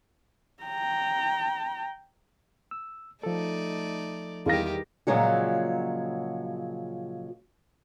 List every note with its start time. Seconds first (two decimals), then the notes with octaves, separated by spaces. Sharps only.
0.63 G5 A#5
2.71 E6
3.23 F3 A3 D#4 A4 D5
4.46 E2 D#3 G3 G4 F5 A#6
5.07 A#2 C#3 F3 F#3 G#3 F#4